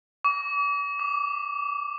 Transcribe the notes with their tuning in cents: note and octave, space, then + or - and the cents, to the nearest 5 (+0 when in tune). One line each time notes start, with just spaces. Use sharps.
D6 -40
D6 +5